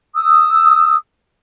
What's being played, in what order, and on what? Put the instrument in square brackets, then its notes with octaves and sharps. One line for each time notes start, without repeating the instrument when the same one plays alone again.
[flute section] D#6 E6